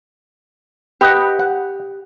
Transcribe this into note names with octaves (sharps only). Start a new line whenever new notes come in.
G4 B4 D#5 F#5
F#5